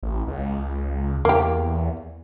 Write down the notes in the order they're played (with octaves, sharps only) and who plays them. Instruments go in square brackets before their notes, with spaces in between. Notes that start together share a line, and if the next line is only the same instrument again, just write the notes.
[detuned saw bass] A1
C#2
[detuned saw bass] E2 [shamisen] A#3 G4